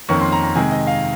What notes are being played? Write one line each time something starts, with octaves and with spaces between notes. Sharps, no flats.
F2 D#3 A#3 C#4 C#6
C6
A#5
A#5
C3 D#3 G#3 G#5
D#5
F5